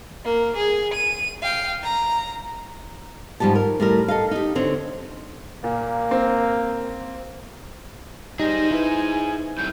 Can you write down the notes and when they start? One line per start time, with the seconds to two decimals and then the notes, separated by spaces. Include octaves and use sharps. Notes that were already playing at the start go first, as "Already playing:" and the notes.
0.25 A#3
0.56 G#4
0.94 D#7
1.43 F5 G5
1.83 A#5
3.40 G#2 F3 G3 G4 A5
3.55 A#4
3.80 A2 G3 A#4
4.08 A4 D#5 F5
4.31 D#4 G4
4.55 D3 C4 C#5
5.64 A#2 A#3
6.11 C4
8.39 G3 D#4 G#4 C5 A#6
8.71 E4 B4 G#5
9.58 C2 A2 G6